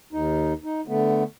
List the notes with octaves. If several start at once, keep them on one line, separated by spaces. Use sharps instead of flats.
D#2 D#4
D#4
D3 A3 B3